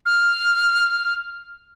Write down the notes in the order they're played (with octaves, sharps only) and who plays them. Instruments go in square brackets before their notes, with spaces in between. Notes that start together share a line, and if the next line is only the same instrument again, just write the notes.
[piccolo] F6